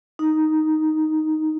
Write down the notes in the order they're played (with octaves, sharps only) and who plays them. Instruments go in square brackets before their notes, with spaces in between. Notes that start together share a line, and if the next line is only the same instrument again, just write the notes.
[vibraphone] D#4